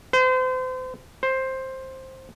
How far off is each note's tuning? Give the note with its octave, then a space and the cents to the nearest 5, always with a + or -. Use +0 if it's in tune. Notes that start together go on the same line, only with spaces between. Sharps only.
C5 -35
C5 +10